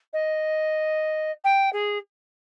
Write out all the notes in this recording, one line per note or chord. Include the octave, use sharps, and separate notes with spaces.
D#5
G5
G#4